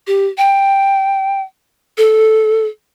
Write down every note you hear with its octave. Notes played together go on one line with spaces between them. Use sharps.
G4
G5
A4